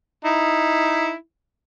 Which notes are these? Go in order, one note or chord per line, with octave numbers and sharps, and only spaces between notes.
D#4 E4